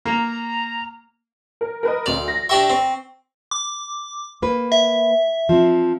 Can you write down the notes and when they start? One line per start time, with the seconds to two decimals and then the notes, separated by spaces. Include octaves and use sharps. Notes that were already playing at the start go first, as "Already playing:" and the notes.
0.05 A#3 A#5
1.61 A#4
1.83 A#4 B4 D#5
2.06 D2 D5 F7
2.28 A#6
2.49 D4 G4 E5 C#6
2.70 C4
3.51 D6
4.42 A#3 B4
4.72 E5
5.49 F3 C4